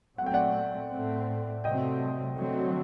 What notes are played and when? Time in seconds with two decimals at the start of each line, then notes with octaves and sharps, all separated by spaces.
0.18 A#2 F#3 A3 C4 F#5
0.26 G5
0.34 D5 F#5
0.91 A2 A3 C4
1.64 C3 F#3 A3 C4 D#5 G5
2.38 D3 F#3 A3 C4